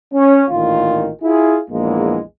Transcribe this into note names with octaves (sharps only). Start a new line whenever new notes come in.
C#4
A1 A#2 D#3 F4
E4 F4 G#4
A#1 E2 G#3 A#3